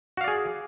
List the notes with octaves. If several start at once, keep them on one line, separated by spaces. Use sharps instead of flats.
F#4 G#4 D5 F5